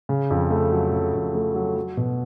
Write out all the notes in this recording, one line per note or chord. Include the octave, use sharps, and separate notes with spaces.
C#3
F2
A3
F#3
C#3
F2
A3
F#3
F#3
B2